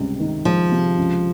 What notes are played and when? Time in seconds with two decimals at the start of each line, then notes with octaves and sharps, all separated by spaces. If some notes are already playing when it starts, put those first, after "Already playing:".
Already playing: C#2 C3 G3
0.20 D#3
0.45 F3 G#3
0.71 C3
0.97 C#2